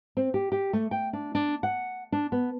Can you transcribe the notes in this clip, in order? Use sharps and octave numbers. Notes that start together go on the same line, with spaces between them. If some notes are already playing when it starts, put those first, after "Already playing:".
C4
G4
G4
A3
G5
D4
D4
F#5
D4
B3